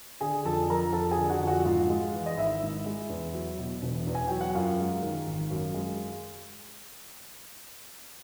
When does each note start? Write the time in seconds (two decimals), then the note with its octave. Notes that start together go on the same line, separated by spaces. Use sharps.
0.21 D3 G#4 G#5
0.45 F2 A4 A5
0.70 F3 A#4 A#5
0.93 F2 A4 A5
1.11 G#4 G#5
1.17 D3
1.30 F#4 F#5
1.42 F2
1.47 F#4 F#5
1.65 G#2 F4 F5
1.90 G#3
2.14 E3
2.26 D#5
2.37 G#1 E4 E5
2.63 G#2
2.86 G#3
3.10 E2
3.34 F#3
3.58 B2
3.82 E1
4.07 E2
4.15 G#5
4.27 F#3 G5
4.41 F#5
4.55 F#2 F4 F5
4.79 G#3
5.02 D#3
5.27 G#1
5.50 F#2
5.74 G#3